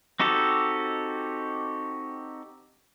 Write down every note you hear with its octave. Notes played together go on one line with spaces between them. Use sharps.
C4 D#4 F#4 G4 A4